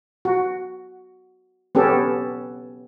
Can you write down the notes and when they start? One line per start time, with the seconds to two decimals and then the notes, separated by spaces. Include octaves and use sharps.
0.25 F#4
1.75 B3 C#4 G4 A4